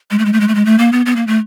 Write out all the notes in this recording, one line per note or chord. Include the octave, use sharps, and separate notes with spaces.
G#3
A3
G#3
A3
G#3
A3
G#3
A3
A#3
B3
B3
A#3
A3